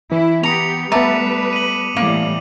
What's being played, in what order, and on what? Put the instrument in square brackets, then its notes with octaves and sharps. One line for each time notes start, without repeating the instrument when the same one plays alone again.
[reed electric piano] E3 [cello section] E4
[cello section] B3 G4 [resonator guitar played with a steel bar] A#5 [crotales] D#6 C#7 F7
[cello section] G3 B4 [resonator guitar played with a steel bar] A3 [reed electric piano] B3 A5 A#5 [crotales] D6 C#7
[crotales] D#7 F#7
[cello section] A2 E3 G3 [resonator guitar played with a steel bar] A#3